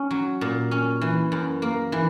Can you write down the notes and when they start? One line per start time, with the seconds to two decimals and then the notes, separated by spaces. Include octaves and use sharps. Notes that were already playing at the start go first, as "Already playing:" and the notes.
Already playing: C#4
0.11 F#3
0.41 A#2
0.71 C#4
1.01 E3
1.32 F#2
1.62 A#3
1.92 E3